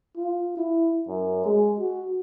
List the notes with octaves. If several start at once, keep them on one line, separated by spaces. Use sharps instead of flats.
F4
E4
F#2
G#3
F#4